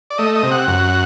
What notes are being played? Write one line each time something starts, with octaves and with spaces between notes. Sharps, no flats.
D5
A3 D#5
D#5
C3
F#5
F#2